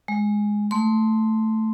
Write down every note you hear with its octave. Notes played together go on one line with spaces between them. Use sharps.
G#3
A3 C6